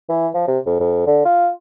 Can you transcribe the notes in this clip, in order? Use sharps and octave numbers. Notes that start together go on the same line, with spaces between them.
E3
F3
C3
F2
F2
D3
F4